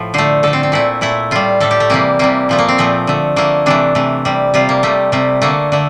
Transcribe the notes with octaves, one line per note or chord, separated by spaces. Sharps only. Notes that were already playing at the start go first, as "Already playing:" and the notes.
Already playing: A2 F3
D3 A3 C5
D3 A3 A4
C4
C4
A#2 A3 E4
A#2 A3 E4
A2 G3 F4
A2 G3 A4
G4
A3
C3 E3 G3 A#3
C3 E3 G3 A#3
A#2 F3 A3
A#3
C4
A#2 F3 A3
D3 A3
D3 A3 A#3
C3 E3 A3 D4
C3 E3 A3
C3 G3
C3 G3 F4
A#3
C3 G3 A3
C3 G3 A3
D3 A3 A#3
D3 A3